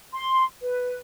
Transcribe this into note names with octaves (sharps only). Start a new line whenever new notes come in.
C6
B4